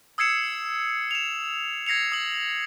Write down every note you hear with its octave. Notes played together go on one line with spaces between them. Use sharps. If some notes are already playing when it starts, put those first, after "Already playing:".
D#6 E6 G#6 C7 C#7 E7
E7 F7
G#6 A#6 C7 C#7 F7
D#6 F#7